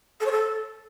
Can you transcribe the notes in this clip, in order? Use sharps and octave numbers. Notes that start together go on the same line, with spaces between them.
A4
C#5
A4